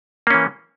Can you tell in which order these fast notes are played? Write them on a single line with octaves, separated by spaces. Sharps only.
A#3 C#4 E3